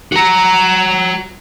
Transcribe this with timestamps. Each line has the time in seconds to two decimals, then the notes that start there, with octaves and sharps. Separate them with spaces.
0.12 F#4 A#5